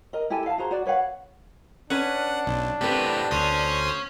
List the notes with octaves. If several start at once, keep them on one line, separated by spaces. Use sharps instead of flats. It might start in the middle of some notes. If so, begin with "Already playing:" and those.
A#4 D#5
E4 G4 A4 G#5
F5 F#5 A5
F#4 G#4 C5 A#5
F#4 D5
B4 C#5 F5 F#5
C#4 D4 B4 F#5
B1
A2 B3 C4 G4 B4
D2 C#4 C5 D#6